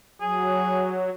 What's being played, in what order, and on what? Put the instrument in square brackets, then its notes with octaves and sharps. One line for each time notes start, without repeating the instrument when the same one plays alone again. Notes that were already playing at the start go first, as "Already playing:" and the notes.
[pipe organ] F#3 [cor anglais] G#4